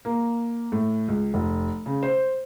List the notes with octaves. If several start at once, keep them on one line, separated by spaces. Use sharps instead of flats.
A#3
A2
C#2
F1
C#3
C5